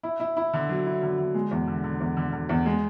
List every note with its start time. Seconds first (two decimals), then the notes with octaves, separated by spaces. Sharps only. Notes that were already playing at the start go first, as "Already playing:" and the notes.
0.03 E4
0.20 E4
0.37 E4
0.53 D3
0.69 F#3
0.86 E4
1.03 D3
1.18 D3
1.35 G#3
1.51 E2
1.67 D3
1.84 D3
2.00 E2
2.17 D3
2.33 D3
2.49 E2
2.66 G#3